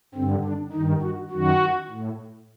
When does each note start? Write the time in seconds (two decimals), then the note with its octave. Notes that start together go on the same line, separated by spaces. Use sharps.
0.15 G2 D3 C4
0.44 D4
0.72 G2 D#3 D#4
1.01 F#4
1.30 F#2 D#3 F#4
1.89 A2